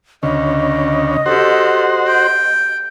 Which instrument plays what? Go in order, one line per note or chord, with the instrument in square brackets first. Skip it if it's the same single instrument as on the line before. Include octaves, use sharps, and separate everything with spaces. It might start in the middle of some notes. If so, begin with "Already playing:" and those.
[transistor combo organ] D2 C#3 [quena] D#5
[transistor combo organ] F#4 C5 [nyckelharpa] G4 A4
[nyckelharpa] G5